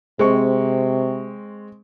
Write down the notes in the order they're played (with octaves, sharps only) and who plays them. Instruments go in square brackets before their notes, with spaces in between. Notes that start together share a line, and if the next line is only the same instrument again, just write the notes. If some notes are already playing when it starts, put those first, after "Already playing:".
[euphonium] C3 [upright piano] G#3 C4 C#6